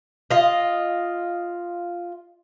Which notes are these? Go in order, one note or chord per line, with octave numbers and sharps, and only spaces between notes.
F4 D#5